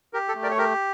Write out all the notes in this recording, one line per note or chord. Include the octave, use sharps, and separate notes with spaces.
G4 A#4
A4
A3
A#4 D5
C#5
G4 A#4